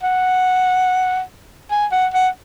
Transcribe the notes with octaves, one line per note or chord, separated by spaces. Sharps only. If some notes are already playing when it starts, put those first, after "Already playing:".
F#5
G#5
F#5
F#5